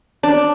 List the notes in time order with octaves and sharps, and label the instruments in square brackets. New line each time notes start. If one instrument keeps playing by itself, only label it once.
[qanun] D4